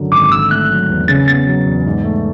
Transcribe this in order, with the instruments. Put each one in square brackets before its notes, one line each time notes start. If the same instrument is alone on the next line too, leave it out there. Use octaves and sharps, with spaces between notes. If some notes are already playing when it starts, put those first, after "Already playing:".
Already playing: [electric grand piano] F#2 D3 F#3
[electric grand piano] G#1 [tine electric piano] D6
[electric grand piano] D3 [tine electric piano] E6
[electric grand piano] A3 [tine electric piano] F#6
[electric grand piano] F#3
E2
[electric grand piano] C#3 [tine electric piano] A6
[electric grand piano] B3 [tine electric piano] A6
[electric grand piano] F#3
E2
G#2
A3